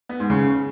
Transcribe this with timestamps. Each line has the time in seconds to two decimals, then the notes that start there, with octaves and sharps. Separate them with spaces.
0.09 B3
0.20 G#2
0.30 C#3